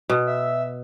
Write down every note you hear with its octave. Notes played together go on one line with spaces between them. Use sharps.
B2
E5